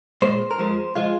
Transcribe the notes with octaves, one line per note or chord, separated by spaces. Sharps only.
A#2 G#3 C5
A#4
F2 F3 G#3 C5
F3 G#3 F4